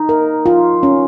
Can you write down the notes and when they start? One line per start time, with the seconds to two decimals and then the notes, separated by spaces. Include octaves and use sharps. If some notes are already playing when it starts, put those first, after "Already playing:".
Already playing: D#4
0.09 A#4
0.46 F4
0.83 C#4